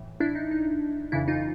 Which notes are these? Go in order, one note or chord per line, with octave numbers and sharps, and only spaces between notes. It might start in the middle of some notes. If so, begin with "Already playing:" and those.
Already playing: A2 E3
D4 E4
D#4
D#4
F2 C#3 E3 D4 E4
D#4 F4